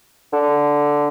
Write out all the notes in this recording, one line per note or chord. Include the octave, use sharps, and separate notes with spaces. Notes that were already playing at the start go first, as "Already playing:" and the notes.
D3